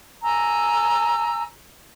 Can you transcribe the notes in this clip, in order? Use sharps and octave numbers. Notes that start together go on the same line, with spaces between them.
G#5 A#5 E6